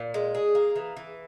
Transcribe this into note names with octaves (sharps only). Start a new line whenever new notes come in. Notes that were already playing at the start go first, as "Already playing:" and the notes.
Already playing: A#2
G#3
G#4
A#3
E3
E3